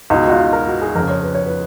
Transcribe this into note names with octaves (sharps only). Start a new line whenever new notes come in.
C#2 B2 D#4
F#4
F4
A#4
F#4
G#4
F2 C#3 A#4
C#5
B4
C#5
B4